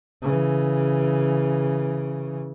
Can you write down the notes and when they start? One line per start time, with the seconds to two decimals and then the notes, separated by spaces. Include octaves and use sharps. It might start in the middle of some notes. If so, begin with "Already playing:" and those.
0.22 C#3 E3